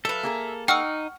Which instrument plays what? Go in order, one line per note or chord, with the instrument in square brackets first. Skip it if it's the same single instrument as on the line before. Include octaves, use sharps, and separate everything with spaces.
[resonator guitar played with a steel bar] F#3 B4 [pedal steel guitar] A4 [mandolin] E5 F5
[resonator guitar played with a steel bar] A#3 G#4 A#4
[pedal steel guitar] D#4 [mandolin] F#5 C#6 F6 [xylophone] G5 E6